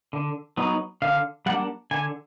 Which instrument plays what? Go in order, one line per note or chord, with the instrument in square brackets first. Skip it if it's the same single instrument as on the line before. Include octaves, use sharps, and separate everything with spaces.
[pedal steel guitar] D3
F#3 B3 D#4
D3 F5
G3 A#3 D4 F#5
D3 G#5